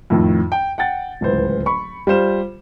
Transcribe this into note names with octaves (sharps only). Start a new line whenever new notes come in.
F2 A2 D#3
G5
F#5 G5 A6
D1 C#2 E3 C5
B5 C#6
G3 F4 C5 E7